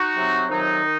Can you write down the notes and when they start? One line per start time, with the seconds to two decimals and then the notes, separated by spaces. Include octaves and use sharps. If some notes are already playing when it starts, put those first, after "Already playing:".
Already playing: D#4 F#4
0.16 C3 F#3 C4
0.49 F2 C3 D#3 F#3 D#4
0.83 D#3